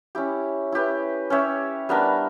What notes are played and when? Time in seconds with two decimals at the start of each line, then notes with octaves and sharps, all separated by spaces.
0.15 C#4 E4 G4
0.72 E4 G4 B4
1.30 C#4 G4 C#5 E5
1.89 G3 B3 D4 A#4